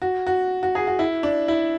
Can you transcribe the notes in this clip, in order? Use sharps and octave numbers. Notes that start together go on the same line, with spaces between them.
F#4
F#4
F#4
G#4
F#4
E4
D4
E4